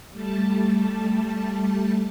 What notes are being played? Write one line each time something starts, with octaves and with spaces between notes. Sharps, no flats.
G3 A3 A5